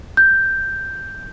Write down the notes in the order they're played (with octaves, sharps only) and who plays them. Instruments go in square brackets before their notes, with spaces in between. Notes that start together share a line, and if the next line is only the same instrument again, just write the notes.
[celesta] G6